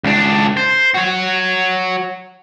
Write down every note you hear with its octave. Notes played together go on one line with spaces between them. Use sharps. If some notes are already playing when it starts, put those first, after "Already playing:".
C#2 D4
C5
F#4 C#5